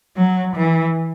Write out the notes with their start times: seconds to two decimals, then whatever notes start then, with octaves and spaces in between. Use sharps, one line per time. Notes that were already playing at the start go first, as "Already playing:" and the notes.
0.17 F#3
0.56 E3